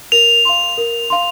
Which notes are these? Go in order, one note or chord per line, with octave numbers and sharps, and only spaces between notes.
A#4 F7
F5 C6
A#4
F5 C6